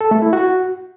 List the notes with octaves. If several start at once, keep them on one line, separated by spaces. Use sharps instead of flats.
A4
A3
E4
F#4